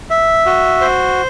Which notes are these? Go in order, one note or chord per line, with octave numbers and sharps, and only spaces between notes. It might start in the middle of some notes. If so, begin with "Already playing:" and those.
E5
F#4
C5